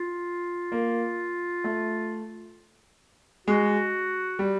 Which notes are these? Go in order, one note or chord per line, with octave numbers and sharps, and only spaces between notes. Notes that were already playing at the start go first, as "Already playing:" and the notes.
Already playing: F4
A#3
A3
G#3 F#4
G3